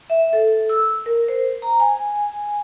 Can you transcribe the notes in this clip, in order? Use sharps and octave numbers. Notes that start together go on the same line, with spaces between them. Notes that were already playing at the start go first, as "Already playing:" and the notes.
E5
A4
E6
A#4
C5
A#5
G#5